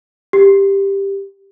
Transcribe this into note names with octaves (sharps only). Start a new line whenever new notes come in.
G4